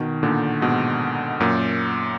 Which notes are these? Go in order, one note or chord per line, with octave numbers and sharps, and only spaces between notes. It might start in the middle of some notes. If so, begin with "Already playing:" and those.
Already playing: B2 D#3
A#2 D3
G#2 B2
F#2 A#2